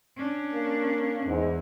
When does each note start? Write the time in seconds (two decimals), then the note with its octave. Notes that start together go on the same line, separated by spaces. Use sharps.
0.16 C#4 D4
0.53 A#3
1.27 E2 G#2